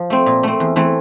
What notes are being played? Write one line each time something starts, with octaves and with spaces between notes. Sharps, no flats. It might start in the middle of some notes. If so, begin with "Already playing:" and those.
Already playing: F3
A3 C4
A#2
A3 C4
E2
E3 A3 C4